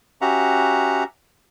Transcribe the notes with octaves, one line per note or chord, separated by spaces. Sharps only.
C#4 F#4 G4 E5 F#5 A#5